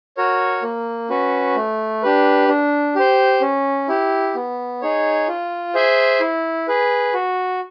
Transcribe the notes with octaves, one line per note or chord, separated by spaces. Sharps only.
F#4 A#4 C#5
A#3
C#4 F#4 B4
A3
D4 G4 B4
D4
G4 C5
C#4
E4 G4
B3
D#4 G#4 C#5
F4
G#4 C5 E5 G#5
E4
G#4 B4
F#4